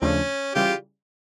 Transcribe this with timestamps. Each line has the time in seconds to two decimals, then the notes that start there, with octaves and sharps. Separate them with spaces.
0.02 D#2 C#3 F3 A3 C#4 D4
0.55 C#3 E3 G3 F4 G4